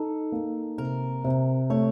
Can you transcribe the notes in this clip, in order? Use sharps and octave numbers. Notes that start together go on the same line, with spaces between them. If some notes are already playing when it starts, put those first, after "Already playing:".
Already playing: D#4 A4
A#3
C3 A#4
C3
A3 C#5